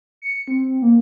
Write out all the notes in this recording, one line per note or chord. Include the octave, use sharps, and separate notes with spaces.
C#7
C4
A#3